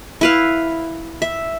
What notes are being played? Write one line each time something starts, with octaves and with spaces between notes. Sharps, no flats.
E4 B4 F5
E5